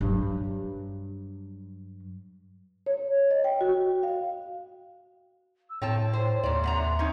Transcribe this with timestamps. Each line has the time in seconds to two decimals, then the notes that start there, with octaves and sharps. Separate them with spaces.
0.01 G2 F#3
2.86 C#5
3.31 D#5
3.44 G5
3.61 F#4
4.03 F5
5.70 E6
5.82 A2 C4 C#5 G5 A5
6.13 C5
6.43 D#2 G#2 D5 C6
6.64 C3 F#5 A#5
6.99 C4 C#4 D#4